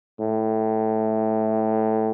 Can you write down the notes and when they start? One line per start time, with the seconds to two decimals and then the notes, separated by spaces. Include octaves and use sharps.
0.20 A2